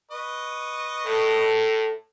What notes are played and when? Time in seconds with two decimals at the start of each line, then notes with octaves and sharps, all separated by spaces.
0.11 B4 D#5 C#6
1.06 A2 A4